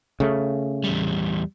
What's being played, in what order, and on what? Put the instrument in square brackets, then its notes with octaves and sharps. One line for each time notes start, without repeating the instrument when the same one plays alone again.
[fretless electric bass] C#3 A3
[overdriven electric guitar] E2 G3